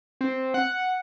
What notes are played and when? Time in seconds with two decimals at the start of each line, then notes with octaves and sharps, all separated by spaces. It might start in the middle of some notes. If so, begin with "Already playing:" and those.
0.21 C4
0.54 F#5